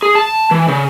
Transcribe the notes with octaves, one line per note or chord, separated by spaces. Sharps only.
G#4
A5
E3
C#3